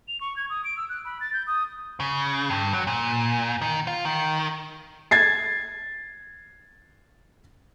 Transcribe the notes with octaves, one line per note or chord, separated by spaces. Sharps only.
F7
C#6
G#6
D#6
D7
E6
F#6
B5
A6
G6
D#6
C#3
G2
F#3
A#2
D#3
F4
D#3
G#6 A6 C7